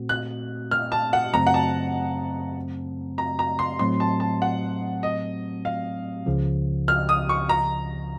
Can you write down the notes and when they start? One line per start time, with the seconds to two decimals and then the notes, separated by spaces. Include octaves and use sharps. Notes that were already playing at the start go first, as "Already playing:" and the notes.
Already playing: A#2 A3 C4 F#4
0.09 F#6
0.71 F6
0.92 A5
1.13 F#5
1.33 F#2 C#3 F#3 A3 C4 A#5
1.47 F#5
1.54 A5
3.18 A#5
3.39 A#5
3.59 C6
3.79 A2 F#3 A3 C4 C6
4.00 A5
4.20 A5
4.42 F#5
5.03 D#5
5.65 F5
6.26 C#2 C#3 F3
6.88 F6
7.09 D#6
7.29 C#6
7.49 A#5